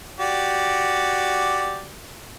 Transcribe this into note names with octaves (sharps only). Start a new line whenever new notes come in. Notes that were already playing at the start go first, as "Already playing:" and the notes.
F#4 G4 D5